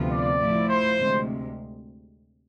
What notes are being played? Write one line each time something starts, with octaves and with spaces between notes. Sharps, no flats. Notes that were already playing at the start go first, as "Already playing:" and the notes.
Already playing: D2 C3 F3 B3 F4
D5
A2 F3 A3 E4
C5
D2 C3 G#3